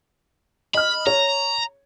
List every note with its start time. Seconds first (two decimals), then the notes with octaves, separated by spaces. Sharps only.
0.75 D#5 B5 F6
1.07 C#5 A#5